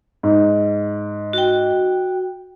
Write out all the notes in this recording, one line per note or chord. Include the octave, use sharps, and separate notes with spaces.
G#2
F#4 G5